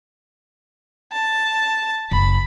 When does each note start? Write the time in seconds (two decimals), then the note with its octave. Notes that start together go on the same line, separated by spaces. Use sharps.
1.12 A5
2.11 F#1 B5